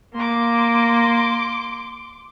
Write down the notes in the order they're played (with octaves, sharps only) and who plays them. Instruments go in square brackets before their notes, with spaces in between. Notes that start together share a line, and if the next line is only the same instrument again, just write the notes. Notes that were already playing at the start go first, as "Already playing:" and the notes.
[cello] A#3 [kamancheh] C6 D6